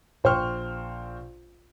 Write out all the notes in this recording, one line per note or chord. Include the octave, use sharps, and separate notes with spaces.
A#1 C5 G5 C#6 F6